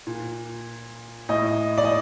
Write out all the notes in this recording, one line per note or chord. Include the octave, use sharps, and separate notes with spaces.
A#2
A2 D#5
D5
D#5